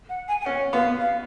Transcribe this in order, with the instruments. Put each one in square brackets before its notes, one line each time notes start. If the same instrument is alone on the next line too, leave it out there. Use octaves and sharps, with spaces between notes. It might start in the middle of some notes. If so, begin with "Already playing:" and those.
[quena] F#5
G#5
G#5
[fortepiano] C#4 [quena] F#5
[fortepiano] B3 [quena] F5
[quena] F5